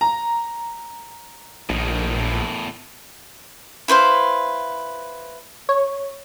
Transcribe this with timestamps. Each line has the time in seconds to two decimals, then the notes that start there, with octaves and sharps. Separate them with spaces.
0.01 A#5
1.70 A#1 A2 D#3
2.15 E2 A2
3.88 E4 B4 C5 F5
5.69 C#5